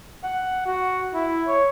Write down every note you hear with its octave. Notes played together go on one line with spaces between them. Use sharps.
F#5
F#4
E4
C#5